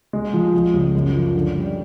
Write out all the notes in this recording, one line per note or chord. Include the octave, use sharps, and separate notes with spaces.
G#3
F3
F3
C#2
F#2
F3
D3
G3